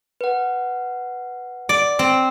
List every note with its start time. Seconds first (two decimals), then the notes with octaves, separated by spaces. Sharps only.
0.21 B4 F#5
1.69 D5
1.99 C4